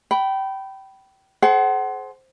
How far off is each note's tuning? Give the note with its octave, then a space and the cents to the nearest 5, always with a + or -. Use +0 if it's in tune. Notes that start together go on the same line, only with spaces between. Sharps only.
G5 -25 B5 +0
G#4 +40 C5 +0 F#5 +30